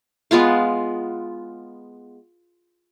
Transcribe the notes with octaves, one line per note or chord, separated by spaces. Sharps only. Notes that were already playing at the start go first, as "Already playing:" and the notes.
G#3 B3 F4 F5